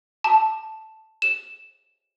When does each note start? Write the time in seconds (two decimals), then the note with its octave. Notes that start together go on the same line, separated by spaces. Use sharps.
0.24 A5
1.22 E7